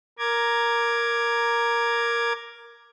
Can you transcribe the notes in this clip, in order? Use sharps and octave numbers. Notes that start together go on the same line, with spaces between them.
A#4 A#5 D6 G#6